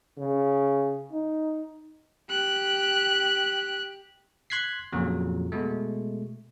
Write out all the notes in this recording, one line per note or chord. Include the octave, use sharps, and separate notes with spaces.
C#3
D#4
G4 F#6
C6 F#6 G#6 B6 C7
F2 A#2 C#3 F#3
B2 G#3 A3